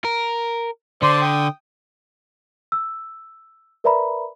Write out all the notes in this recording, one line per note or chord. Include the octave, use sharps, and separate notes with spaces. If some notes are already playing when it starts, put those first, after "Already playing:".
A#4
D3 C5 D5 C6
G5 D#6
E6
A#4 B4 D5 E5 A#5 B5